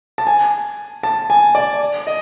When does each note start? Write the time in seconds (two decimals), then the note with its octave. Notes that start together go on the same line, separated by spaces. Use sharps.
0.18 A5
0.27 G#5
1.03 A5
1.30 G#5
1.55 D5
2.07 D#5